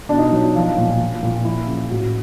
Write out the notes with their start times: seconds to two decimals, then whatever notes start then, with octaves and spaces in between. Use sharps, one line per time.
0.09 B2 D4
0.18 D#4
0.27 F#3 D4
0.55 F3
0.77 A#2
0.99 F3
1.23 A#2
1.45 F3 E4
1.67 C#3
1.90 A2 F#4